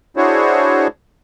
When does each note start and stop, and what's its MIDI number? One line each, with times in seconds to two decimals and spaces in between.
0.17 0.87 62
0.17 0.87 64
0.17 0.87 66
0.17 0.87 68
0.17 0.87 72
0.17 0.87 73